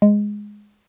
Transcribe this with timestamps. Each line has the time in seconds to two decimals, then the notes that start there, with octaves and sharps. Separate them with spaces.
0.02 G#3